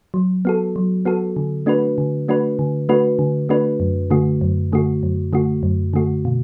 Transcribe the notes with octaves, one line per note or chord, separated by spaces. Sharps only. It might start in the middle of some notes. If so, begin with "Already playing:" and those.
F#3
B3 F#4 A4
F#3
B3 F#4 A4
D3
A3 D4 F#4 B4
D3
A3 D4 F#4 B4
D3
A3 D4 F#4 B4
D3
A3 D4 F#4 B4
F#2
D3 A3 F#4
F#2
D3 A3 F#4
F#2
D3 A3 F#4
F#2
D3 A3 F#4
B2